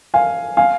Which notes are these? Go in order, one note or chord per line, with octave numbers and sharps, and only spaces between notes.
F5 G#5
F5 G#5